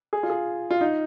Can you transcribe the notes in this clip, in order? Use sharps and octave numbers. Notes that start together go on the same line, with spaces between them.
G#4
F4
G#4
F4
D#4